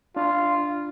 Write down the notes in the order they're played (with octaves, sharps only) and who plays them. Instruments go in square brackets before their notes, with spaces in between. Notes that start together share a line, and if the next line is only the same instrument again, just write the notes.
[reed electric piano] D4 [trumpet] F4